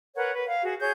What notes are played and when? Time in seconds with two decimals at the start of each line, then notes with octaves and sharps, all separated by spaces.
0.16 A#4 B4 C#5 F#5
0.32 B4
0.47 F5
0.62 F#4 G#4
0.80 G#4 C#5 G6